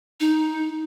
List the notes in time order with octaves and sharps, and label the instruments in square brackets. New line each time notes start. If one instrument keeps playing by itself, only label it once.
[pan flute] D#4